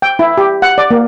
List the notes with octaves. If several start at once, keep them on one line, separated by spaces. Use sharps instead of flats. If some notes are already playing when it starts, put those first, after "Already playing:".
G5
E4
G4
F#5
D5
A#3